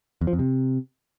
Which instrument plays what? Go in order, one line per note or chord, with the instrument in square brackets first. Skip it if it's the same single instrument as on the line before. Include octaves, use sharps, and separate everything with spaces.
[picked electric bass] E2
F3
F2
C3